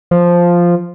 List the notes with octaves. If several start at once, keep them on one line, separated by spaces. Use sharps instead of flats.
F3